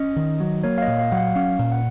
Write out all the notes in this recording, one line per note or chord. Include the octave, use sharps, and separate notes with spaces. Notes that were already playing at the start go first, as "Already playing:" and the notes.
Already playing: C#4 D#5
D#3
F#3
A#3 C#5
F5
D#5
A#2
F5
F#3 F#5
F5
C#4 F5
A#2
F#5